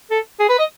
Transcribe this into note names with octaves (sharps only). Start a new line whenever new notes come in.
A4
G#4
B4
D#5